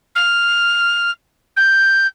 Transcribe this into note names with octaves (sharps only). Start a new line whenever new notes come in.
F6
G6